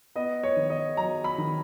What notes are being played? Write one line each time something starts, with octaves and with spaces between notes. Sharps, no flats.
B3 D#5
C#5
D#3
D#5
F#3 A#5
B5
D#3